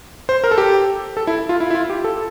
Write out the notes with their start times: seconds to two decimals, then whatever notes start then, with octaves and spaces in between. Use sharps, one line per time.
0.29 C5
0.44 A#4
0.51 A4
0.58 G4
1.17 A4
1.27 E4
1.49 F4
1.60 E4
1.70 E4
1.75 F4
1.90 G4
2.04 A4